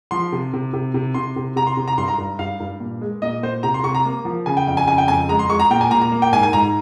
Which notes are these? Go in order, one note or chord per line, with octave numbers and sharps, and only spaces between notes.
F3 C6
C3
C3
C3
C3
C3 C6
C3
C3 A#5
C6
C3
A#5
G2 C6
A#5
G2
G2 F5
G2
A#2
G#3
A#2 D#5
A#2 C5
C3 A#5
C6
C3 C#6
A#5
A#3
F3
C#3 G#5
G5
F2 G5
G#5
C#3 G#5
G5
F2 G#5
G#3 A#5
C6
G#3 C#6
A#5
A#2 G5
G#5
A#2 A#5
A#5
A#3
G5
G#2 G#5
G#5
G#2 A#5